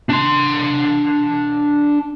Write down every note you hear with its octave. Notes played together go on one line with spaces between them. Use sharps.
D4 C6